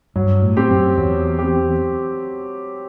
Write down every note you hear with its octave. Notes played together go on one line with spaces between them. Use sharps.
G2 F#3
A2
C4 G4
F#2
E2 F#3
C4 G4